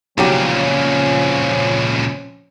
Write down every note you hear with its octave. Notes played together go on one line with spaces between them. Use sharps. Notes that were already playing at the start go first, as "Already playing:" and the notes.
B1 A#2 C#3 F3 F#3 C4 C#4 G4